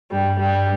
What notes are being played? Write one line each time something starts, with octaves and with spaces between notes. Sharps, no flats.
G2 G3
G2 G3